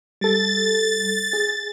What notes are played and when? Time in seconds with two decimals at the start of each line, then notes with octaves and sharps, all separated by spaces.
0.21 G3 A4 A6
1.33 G#4